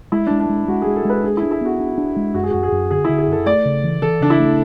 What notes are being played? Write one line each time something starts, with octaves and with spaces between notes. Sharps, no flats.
G#3 E4
G#3 D4
D4
G#3
G#3 F#4
G#4
G#3
A4
G#3 B4
D4 G#4
E4
D4
E4
B3 F#4
D4
D4
G#3
F#2 F#4
G#4
F#2 F#4
G#4
F#2
D3 G#4
D3 E4
G#4
F#2 A4
A3 D5
C#3
E3
E3 A4
C#3 D4
E4
A3